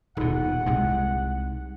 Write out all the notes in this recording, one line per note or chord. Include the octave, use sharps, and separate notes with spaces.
D#1 B2 D#4 F#5
C2 C3 G#3